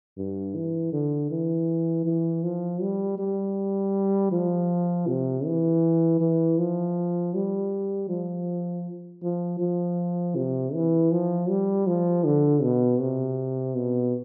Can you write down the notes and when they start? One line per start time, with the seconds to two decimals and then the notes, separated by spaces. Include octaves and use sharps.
0.18 G2
0.55 E3
0.93 D3
1.31 E3
2.05 E3
2.44 F3
2.82 G3
3.19 G3
4.32 F3
5.07 C3
5.46 E3
6.21 E3
6.58 F3
7.34 G3
8.09 F3
9.23 F3
9.60 F3
10.36 C3
10.74 E3
11.12 F3
11.49 G3
11.87 F3
12.25 D3
12.63 B2
13.00 C3
13.75 B2